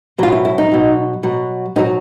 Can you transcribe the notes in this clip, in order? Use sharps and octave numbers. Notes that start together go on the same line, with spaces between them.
B2 F#3 F4
E4
E4
D#4
B2 F#3
B2 F#3
B2 F#3 D#4